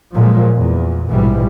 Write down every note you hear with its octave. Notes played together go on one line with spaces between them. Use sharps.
A#2 F3 F#3 G#3
E2 A#2
A#1 G#2 B2 E3 G3